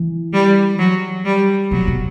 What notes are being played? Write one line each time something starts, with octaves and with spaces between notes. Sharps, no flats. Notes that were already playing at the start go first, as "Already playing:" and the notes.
Already playing: E3
G3
F#3
G3
B2 F#3
B2